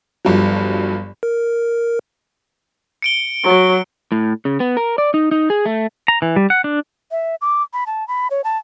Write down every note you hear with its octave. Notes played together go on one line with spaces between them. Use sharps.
G1 G2 F3 F#3
A#4
C#7 D7 G7
F#3
A2
C#3
B3
A#4
D5
D#4
D#4
G#4
A3
A#5
E3
G3
F#5
D4
E5
D6
B5
A5
B5
C#5
A5